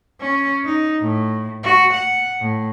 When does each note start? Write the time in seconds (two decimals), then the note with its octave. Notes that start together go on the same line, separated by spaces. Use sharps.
0.21 C#4
0.65 D#4
1.01 A2
1.64 F#4
1.94 F#5
2.41 A2